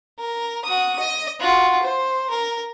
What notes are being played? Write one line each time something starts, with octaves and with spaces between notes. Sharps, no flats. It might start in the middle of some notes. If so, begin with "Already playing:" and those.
A#4
F#4 D#6
D#5
F4 F#4
C5
A#4